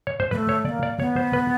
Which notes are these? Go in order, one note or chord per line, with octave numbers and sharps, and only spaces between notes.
C#5
C5
A3 A#3 B4
C#5
A#3 B3 D5
D5
B3 C#5
C5
B4